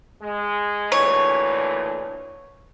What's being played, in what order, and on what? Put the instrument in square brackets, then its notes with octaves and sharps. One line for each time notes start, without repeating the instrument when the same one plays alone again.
[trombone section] G#3
[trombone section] D2 A#2 E3 [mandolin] C#5